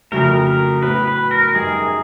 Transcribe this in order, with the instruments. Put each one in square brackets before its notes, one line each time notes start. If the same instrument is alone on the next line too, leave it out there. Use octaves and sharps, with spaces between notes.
[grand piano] F2 C#3 F#3 A3 [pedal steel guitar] A#4
[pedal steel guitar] A#4
[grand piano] A2 F#3 B3 [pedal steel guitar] B4
[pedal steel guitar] B4
A#4
[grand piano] F#2 D#3 G3 [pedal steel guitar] G#4